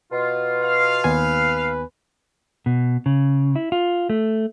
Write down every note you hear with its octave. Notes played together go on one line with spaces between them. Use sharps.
B2 F4
F5
D#2 B3 B4 G#5
B2
C#3
E4
F4
A3